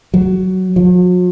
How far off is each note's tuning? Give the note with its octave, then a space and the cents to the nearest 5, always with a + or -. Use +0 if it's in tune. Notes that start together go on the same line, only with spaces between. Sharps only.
F#3 +10
F#3 -45